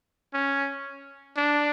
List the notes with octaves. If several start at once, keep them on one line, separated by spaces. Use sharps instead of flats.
C#4
D4